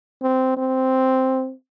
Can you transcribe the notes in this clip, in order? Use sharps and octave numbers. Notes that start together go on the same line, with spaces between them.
C4
C4